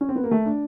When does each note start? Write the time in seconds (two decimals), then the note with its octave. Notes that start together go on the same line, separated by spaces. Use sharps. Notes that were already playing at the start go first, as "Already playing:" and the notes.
0.01 C#4
0.09 C4
0.16 B3
0.24 A#3
0.31 A3
0.46 D4